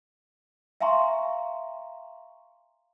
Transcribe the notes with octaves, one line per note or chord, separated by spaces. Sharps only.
E5 F5 G#5 A#5 C6 C#6